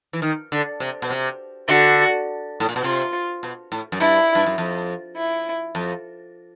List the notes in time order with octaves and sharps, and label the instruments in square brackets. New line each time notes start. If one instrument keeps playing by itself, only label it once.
[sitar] E3
D#3
D3
C3
B2
C3
[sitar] D3 [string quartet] F#4
[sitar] A2
A#2
B2
[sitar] C3 [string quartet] F4
[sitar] B2
A2
F#2
[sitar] G2 [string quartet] E4
[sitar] G2
F#2
F2
[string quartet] E4
[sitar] F2